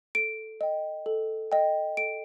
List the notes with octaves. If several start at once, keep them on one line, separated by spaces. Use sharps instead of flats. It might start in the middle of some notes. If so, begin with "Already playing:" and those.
A4 D7
D#5 G5
A4
D#5 G5
A4 D7